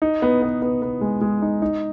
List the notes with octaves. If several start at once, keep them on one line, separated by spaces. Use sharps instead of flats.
D#4
B3
B3
B3
B3
G#3
G#3
D#4
D#4